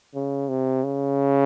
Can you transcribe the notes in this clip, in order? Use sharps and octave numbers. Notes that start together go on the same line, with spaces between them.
C#3
C3
C#3